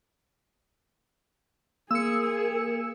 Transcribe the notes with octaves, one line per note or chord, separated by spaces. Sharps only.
A#3 G#4 A#4 E6 C#7